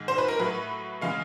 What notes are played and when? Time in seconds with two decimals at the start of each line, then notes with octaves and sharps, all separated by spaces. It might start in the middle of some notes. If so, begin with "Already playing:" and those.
Already playing: G#2 D#3 G#3
0.08 C5
0.18 B4
0.28 A#4
0.39 A2 F#3 B4
1.01 C#3 E3 G#3 F5